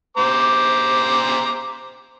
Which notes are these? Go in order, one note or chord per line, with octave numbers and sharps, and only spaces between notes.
C5 A#5 D6